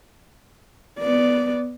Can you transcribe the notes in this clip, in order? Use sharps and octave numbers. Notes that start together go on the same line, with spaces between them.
B3 D5